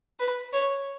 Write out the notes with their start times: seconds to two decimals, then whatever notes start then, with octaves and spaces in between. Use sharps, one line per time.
0.20 B4
0.53 C#5